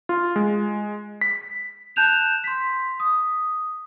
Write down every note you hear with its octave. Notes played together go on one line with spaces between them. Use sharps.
F4
G#3
B6
A5 F#6 G6 E7 F7
C6 B6
D#6